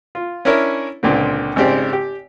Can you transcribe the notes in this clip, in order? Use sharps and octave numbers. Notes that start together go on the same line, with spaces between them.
F4
C#4 D4 E4 A#4 C#5
C#2 A#2 D3 C4
G#1 C#3 C4 G4 C5 D5
G4